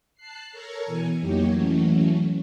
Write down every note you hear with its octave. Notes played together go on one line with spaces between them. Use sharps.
A5 F#6 C7
A4 A#4 C#5 A#5 C#6
B2 E3 G#5
F2 F#3 A#3 D#4 G4 C#5
E3 F#3 A3 C#4